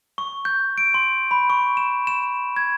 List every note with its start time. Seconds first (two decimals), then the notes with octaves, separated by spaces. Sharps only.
0.18 C#6
0.45 G6
0.78 D7
0.94 C6
1.31 B5
1.50 C#6
1.77 E7
2.07 E7
2.56 G#6